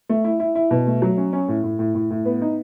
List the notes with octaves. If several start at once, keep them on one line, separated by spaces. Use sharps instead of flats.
A3
E4
E4
E4
B2
A3
F#3
C#4
C#4
A2
A2
A2
A2
A2
B3
D#4